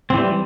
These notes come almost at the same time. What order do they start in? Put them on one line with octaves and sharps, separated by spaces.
C4 E3 G3